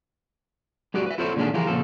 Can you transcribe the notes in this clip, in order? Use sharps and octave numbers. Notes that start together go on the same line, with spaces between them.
G#3 F#4 G4 B4 D5
B4 E5
E4 F4 A4 C5 C#5
A#2 D3 D#3 G#3 C#4 D4
E3 F3 F4 G4 G#4 A#4
A#2 C#3 F3 A4